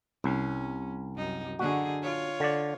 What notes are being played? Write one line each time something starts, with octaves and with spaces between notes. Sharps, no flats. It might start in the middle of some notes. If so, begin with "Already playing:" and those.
C2 C#4
F#2 D#4
D3 D#4 F#4 G#4
F4 C#5
D3 D5